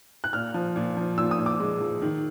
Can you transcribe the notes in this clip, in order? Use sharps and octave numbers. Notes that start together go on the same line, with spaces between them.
F#6
A#2 F6
F3
A#2
F3
A#2 E6
D#6
A#2
D6
G#3
F3
D#3